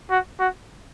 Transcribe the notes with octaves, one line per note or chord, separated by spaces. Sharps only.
F#4
F#4